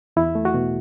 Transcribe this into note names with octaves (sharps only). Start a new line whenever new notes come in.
E2 E4
A3
F#4
B2